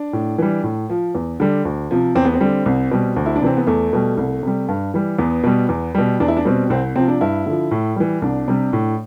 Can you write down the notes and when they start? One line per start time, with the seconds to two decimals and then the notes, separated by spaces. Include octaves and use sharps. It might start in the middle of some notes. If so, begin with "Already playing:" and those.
Already playing: D4
0.13 A2
0.38 E3 G3
0.63 A2
0.90 F3
1.15 E2
1.40 D3 G3
1.65 D2
1.91 C3 F3
2.15 E2 C4
2.25 B3
2.34 C4
2.41 D3 G3
2.66 C2
2.91 B2 G3
3.16 D2
3.26 E4
3.36 D4
3.42 C3 E3 C4
3.57 B3
3.67 E2 A3
3.93 B2 G3
4.17 C2
4.43 C3 G3
4.68 G2
4.94 E3 G3
5.18 E2 B3
5.43 B2 G3
5.69 E2
5.95 B2 G3
6.20 E2 D4
6.28 E4
6.37 D4
6.45 B2 G3 C4
6.70 C2 C4
6.96 C3 F3 C4
7.08 D4
7.21 G2 E4
7.46 D3 F3
7.71 A2
7.96 E3 G3
8.22 C2 D4
8.48 C3 G3
8.73 A2